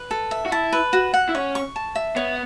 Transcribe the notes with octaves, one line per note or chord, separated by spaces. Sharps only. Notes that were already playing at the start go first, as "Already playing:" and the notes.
Already playing: B4
A4
E5
F#4
E4 A5
B4
F#4
F#5
E4
C#4 C#6
C#6
A5
E5
B3 C#5